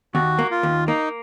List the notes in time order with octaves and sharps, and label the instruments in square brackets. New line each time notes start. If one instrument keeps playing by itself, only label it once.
[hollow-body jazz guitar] D#2 [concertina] F#4
[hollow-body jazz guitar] A#3
[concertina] F4
[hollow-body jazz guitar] D#2
[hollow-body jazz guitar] A#3 [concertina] D#4